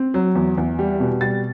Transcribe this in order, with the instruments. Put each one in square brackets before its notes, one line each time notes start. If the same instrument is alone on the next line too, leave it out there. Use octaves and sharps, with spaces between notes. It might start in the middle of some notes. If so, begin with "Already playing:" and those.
Already playing: [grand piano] C4
F#3
E2
E2
G3
B2
G3 A6